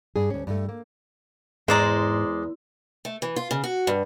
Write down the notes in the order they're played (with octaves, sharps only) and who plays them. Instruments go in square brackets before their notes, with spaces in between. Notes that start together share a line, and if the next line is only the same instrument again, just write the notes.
[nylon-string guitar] G2 G#4
D2 C#4
G2 A3
A#3
[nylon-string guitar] E2 [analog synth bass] G#2 [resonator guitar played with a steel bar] G#3 [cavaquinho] C5 D5 A#5
[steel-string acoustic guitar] A3
E3
F4
C#3
F#4
G2